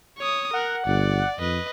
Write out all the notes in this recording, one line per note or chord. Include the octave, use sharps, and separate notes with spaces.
C#5 D#6
A#4 F#5
G1 D5
F2 B4 D#5